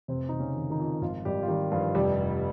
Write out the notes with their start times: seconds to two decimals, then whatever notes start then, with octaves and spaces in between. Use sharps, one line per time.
0.08 F1 C3 C4
0.29 F1 D#4
0.39 C#3 C#4
0.55 D#3
0.70 D#3 D#4
0.79 F2
1.01 G#1 F3 F4
1.25 G#1 G3 G4
1.43 F4
1.48 D#3 G3 G4
1.72 G2 F3 F4
1.95 F1 G3 G4
2.18 F1